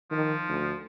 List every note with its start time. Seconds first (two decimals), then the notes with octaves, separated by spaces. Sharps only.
0.11 D#3 F3
0.49 D2